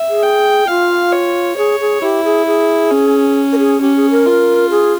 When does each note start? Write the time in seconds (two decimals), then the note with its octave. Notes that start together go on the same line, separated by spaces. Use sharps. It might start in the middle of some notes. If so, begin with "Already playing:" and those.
Already playing: E5
0.09 G#4
0.23 G5
0.67 F4 F5
1.12 C#5
1.57 G#4 C#5
1.80 G#4
2.02 E4 G4
2.24 G#4
2.46 G#4
2.91 C#4
3.52 A#4
3.58 G#4
3.81 C#4 G4
3.96 G#4
4.10 A#4
4.26 F4
4.70 G#4